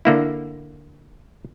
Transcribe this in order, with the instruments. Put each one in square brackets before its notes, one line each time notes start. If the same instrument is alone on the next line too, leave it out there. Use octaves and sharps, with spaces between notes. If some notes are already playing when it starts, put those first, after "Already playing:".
[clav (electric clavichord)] D3 A#3 E4